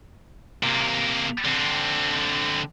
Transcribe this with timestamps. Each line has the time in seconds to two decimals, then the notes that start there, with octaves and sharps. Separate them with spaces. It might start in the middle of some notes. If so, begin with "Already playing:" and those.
0.63 C3 A#3
1.45 D3 C4